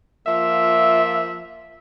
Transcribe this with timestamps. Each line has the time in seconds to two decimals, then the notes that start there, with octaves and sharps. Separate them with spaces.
0.26 F3 A#3 F4 E5